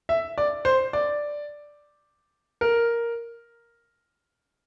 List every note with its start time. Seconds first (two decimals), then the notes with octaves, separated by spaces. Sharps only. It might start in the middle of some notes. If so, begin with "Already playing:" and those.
0.09 E5
0.38 D5
0.65 C5
0.93 D5
2.61 A#4